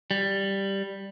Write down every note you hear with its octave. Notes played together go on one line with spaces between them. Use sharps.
G3